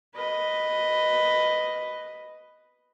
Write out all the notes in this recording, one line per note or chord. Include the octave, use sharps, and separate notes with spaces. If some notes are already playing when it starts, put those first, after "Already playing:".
B4 D#5